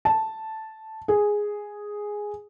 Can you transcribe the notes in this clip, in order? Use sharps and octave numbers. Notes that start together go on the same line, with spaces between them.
A5
G#4